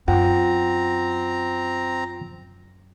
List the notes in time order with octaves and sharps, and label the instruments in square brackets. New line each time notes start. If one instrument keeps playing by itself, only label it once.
[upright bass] F#2 [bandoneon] C4 A#5 [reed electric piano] F4 F#5 G5